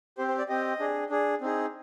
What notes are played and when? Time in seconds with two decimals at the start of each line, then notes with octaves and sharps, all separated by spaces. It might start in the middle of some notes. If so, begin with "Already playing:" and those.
0.18 C4 G4 C5
0.28 C5
0.38 D5
0.49 C4 G4 D#5
0.79 D4 G#4
1.10 D4 G#4
1.41 C4 D#4 G#4